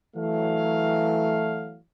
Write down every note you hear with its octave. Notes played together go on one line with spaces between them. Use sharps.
E3 F#3 A3 F5